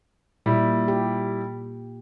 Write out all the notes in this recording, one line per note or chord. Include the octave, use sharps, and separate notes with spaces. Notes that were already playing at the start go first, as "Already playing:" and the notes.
A#2 G3 E4
G4